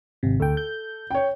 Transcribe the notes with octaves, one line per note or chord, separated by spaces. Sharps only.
G#1 C3
D2 A4 G5
G6
C#5 G5